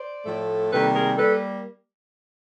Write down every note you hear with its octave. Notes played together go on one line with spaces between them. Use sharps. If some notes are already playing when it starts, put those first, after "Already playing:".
Already playing: C5 D5
A2 F3 A3
C3 D#3 G3 A#3 A4 B4
G#4 A#4
G3 A#3 A4 B4